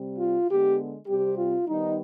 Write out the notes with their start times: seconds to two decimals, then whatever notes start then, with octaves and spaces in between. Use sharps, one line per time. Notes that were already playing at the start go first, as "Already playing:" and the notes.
Already playing: C3 G3 C4
0.18 F4
0.48 D3 G#3 B3 G4
1.07 C3 G3 C4 G4
1.37 F4
1.68 D#3 G3 B3 D#4